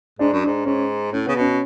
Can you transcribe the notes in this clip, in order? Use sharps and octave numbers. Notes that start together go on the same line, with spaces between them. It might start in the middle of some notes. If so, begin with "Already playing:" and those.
G#2 D4
F#2
G#2 D4
G#2 C#4
A2 C#4
C#3 B3
B2 C#4